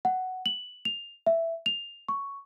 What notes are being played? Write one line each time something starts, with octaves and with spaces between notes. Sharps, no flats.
F#5
F#7
F7
E5
F7
C#6